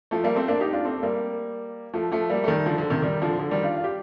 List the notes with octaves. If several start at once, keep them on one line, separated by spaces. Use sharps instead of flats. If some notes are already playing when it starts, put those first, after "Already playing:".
F3 A3
G3 A#3
A3 C4
A#3 D4
D#4 G4
D4 F4
A3 C4
A3
G3 A#3
F3 A3
F3 A3
G3 A#3
A3
D#3 G3
D3 F3
D3
C3 D#3
D#3 G3
D3 F3
D3 F3
D#3 G3
D4 F4
F4
G4